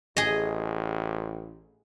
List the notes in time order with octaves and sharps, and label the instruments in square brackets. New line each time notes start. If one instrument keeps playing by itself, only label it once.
[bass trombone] A1 [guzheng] G#4 D#5